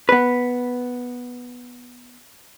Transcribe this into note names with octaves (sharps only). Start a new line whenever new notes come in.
B3 B4